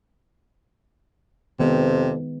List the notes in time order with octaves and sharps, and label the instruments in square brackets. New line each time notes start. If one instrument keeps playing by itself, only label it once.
[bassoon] F2 [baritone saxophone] C3 [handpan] D#3 G#3 B3